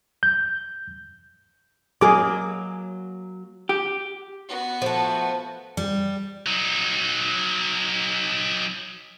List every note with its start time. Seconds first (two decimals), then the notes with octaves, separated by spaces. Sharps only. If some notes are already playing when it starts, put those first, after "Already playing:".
0.23 G6
2.01 F#3 A#3 G#4 D6
3.69 G4
4.49 B3 F#4
4.82 F3 A3
5.77 G3
6.46 F#3 D#4